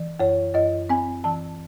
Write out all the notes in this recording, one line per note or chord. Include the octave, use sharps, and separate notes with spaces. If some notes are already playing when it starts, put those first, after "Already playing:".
Already playing: E3
F#2 C#5
F#2 D#5
C4 G#5
E3 A5